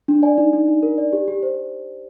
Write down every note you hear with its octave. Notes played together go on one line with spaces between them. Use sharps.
D4
D5 G#5
D#4
D#4
D#4
A#4
D5
G4
G4
C5